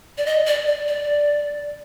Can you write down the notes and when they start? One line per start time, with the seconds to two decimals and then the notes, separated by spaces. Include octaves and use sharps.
0.18 D5
0.26 D#5
0.47 D5
0.67 D5
0.88 D5